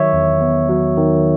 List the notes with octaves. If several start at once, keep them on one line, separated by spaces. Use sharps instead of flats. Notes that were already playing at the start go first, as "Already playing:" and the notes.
Already playing: D#3 F#3 C#5 E5
E2
B3
F#3
D#3